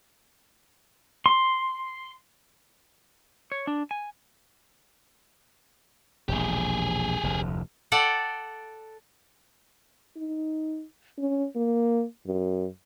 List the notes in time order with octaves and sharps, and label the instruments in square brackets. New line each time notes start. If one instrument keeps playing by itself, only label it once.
[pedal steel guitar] C6
[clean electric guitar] C#5
D4
G#5
[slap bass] E1 A#1 [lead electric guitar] G4 G#4
[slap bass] F1 D2
[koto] A4 D5 F#5 G5
[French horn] D#4
C#4
A#3
F#2